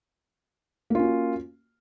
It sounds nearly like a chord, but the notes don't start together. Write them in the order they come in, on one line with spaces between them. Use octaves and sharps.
A#3 F4 C#4 F#4